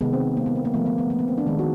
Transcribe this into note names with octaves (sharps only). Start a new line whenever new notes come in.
C3 D#3 G#3 B3
C4
A#3
B3
C4
A#3
D3 F3 A3 B3
B3
B3
A#3
B3
C4
D4
D#3 G#3
F#4